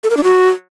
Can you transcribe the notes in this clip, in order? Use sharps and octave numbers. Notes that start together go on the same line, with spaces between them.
A4
A#4
D4
F#4